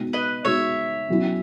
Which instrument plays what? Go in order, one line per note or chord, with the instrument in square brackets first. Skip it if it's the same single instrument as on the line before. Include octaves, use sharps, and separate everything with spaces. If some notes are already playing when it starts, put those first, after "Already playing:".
Already playing: [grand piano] B2 G#3 B3 D#4 F#4
[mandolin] B4 D#5
[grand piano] B2 G#3 B3 D#4 F#4 [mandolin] C#5 E5
[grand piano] B2 F#3 C#4 E4